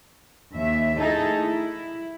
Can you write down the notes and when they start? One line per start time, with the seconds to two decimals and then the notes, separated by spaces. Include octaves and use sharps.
0.52 D#2 E5
0.98 A3 D#4 E4 G#4 A4
1.40 E4